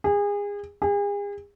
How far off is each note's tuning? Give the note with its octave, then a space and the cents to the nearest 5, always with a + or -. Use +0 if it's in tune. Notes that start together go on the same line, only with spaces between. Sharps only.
G#4 -30
G#4 -40